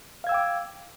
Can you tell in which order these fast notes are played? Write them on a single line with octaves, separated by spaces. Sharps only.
F5 G#6 E6 G5 D6